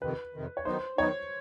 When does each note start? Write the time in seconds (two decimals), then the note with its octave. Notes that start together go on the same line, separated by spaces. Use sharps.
0.02 F2 C3 D#3 B4
0.34 F2 C3 D#3
0.57 C#5
0.65 D#3 F#3 B3 D#4 C5
0.98 D#3 F#3 B3 D#4 C#5